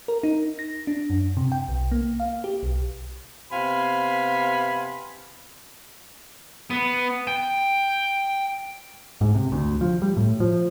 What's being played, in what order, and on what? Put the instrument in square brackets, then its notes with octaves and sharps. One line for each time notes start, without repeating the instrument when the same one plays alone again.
[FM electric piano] A#4
D#4
A#6
D4
F#2
C3
G5
B1
A#3
F5
G4
B1
[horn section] C3 B3 F5 G#5 B5 C6
[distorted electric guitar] B3
G5
[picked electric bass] G#2
C3
D2
F3
G3
A2
F3